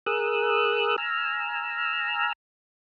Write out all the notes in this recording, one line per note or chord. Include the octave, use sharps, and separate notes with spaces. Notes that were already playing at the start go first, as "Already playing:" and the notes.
G#4 A#4 D#6 E6 F#6
G#5 A#5 E6 F6